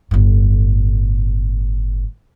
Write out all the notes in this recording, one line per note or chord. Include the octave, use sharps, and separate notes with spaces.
G1 A2